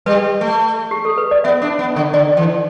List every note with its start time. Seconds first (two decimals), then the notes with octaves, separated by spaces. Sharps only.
0.06 G3 B4
0.41 A3
0.91 G4
1.05 A4
1.18 B4
1.31 D5
1.44 B3 E5
1.62 D4
1.79 B3
1.96 D3
2.14 D3 D5
2.37 E3